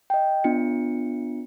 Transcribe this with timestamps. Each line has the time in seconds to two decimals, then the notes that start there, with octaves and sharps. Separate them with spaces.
0.10 D#5 G5
0.44 B3 D4 F4 C#7